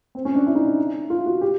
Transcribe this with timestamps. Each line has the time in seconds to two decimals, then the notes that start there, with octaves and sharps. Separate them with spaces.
0.15 C4
0.25 C#4
0.35 D4
0.46 E4
0.55 D#4
0.65 E4
1.10 F4
1.26 F#4
1.41 G4